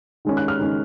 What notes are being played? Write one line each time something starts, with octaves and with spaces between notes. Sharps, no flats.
D#3 G#3 C#4
F#6
F6
D#3 G#3 C#4